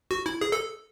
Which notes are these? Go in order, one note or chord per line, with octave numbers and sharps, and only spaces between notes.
F#4
E4
G#4
A4